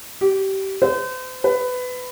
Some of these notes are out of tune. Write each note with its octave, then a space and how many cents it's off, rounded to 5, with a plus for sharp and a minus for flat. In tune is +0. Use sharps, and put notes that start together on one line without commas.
G4 -25
C5 -40
B4 +20